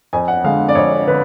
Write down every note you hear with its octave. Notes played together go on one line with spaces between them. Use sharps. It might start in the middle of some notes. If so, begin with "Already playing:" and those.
F2 G#5
F#5
D3 G#3 F5
D5
F2 C#5
D3 B4